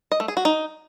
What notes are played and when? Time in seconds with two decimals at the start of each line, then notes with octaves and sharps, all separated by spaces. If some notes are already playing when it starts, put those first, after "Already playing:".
0.12 D#5
0.20 A3
0.28 G#4
0.37 F#4
0.45 D#4